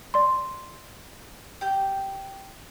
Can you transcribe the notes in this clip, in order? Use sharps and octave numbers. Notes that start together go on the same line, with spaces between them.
D5 C6
G4 G6